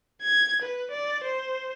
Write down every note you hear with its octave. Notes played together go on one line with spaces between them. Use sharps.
G#6
B4
D5
C5